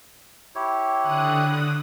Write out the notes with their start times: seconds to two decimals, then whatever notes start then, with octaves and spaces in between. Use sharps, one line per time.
0.55 E4 G4 C#5
1.01 D3 D#6 F#6